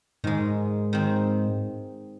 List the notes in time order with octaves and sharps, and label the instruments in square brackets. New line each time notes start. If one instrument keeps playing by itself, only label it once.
[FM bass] G#2 [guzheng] D#3 G#3
[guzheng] D#3 C4